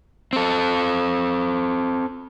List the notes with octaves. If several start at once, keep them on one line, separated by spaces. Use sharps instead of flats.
C4 A4